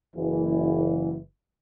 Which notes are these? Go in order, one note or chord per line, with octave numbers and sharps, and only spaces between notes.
F#1 E3